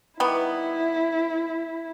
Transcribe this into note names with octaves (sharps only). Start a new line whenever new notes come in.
D#3 G3 B3 E4